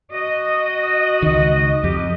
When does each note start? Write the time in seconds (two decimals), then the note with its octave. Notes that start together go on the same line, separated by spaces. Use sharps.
0.13 F#4 D#5
1.22 C#2 D#3
1.84 F2 G4